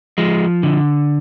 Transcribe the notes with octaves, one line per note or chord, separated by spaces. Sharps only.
F3 G#3
D3